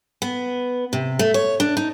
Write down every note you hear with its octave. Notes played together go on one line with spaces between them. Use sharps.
B3
C3
A3
C#5
D4
D#4